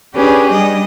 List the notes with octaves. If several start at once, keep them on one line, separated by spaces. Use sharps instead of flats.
C#4 D4 G4 G#4 B4
G3 D4 D#5